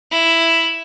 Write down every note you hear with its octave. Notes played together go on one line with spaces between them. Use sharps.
E4